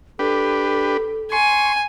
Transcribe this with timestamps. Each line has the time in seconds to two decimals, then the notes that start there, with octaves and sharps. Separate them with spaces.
0.19 D4 G4 A4 B4
1.32 G#5 C6 C#6